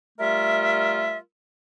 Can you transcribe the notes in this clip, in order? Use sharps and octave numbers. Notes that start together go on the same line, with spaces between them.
G3 A3 F4 A#4 E5